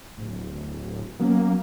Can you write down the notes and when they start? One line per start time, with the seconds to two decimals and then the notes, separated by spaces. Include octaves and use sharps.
0.18 D1
1.20 F#3 A#3 B3 C#4